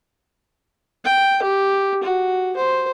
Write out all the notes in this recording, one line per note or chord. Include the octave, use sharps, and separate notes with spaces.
G5
G4
F#4
C5